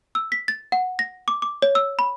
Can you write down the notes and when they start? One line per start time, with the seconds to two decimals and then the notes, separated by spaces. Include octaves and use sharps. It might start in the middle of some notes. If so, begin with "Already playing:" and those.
0.15 E6
0.32 B6
0.48 A6
0.72 F#5
0.99 A#6
1.28 D6
1.42 D6
1.62 C#5
1.75 E6
1.99 B5